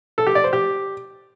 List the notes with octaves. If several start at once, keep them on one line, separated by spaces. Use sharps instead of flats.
A4
G4
D5
C5
G4